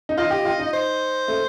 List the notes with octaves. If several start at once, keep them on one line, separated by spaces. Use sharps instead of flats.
D#4
F4 D#5
G4
F4
D#4
C5
A3